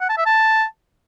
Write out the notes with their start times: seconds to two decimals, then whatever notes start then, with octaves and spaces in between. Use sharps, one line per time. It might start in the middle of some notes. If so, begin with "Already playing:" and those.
0.01 F#5
0.09 A5
0.18 E5
0.26 A5